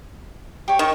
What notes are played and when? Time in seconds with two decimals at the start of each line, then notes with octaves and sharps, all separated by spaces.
0.68 G4 C#5
0.79 D#3 C#6